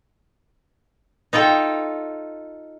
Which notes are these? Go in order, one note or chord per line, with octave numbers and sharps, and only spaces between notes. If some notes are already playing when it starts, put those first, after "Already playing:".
D#4 F4 A4 G5